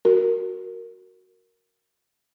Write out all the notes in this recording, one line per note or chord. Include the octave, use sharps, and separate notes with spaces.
F#4 A#4